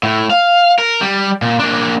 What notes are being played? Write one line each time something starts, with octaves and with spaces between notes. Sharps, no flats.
A2
F5
A#4
G3
A#2
A#3 D4